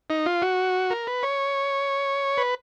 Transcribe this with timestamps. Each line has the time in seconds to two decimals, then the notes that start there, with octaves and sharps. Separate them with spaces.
0.10 D#4
0.26 F4
0.42 F#4
0.90 A#4
1.07 B4
1.23 C#5
2.37 B4